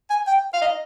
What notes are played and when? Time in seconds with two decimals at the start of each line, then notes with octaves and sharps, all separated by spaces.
0.10 G#5
0.27 G5
0.54 F5
0.62 D#5